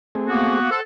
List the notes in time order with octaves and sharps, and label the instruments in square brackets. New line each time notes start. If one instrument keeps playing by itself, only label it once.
[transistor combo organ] A3 C4 G#4
[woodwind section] A#3 B3 F#4
[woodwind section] A4 [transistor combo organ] C5 F#5